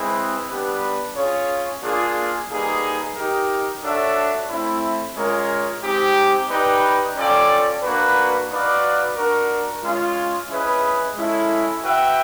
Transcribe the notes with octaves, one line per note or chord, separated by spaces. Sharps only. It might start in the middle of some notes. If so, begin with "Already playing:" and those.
Already playing: G#3 C4 E4 G#4 B4
G3 B3 D4 G4 B4
C#4 F4 G#4 C#5
A#3 D4 F4 G#4
G3 A#3 D#4 G#4 B4
D#4 G4 A#4
D4 F#4 A4 C#5 E5
A3 C4 E4
G#3 C#4 F4 A#4
G#3 C4 D#4 G4
D#4 G4 B4 D5 G5
C#4 F4 A4 D5 G5
A#3 D4 F#4 B4
D#4 F#4 B4 D5 F5
D4 F#4 A#4
G#3 C#4 F4
C#4 E4 G#4 B4 D#5
G#3 C#4 E4 A4
F#4 B4 E5 G5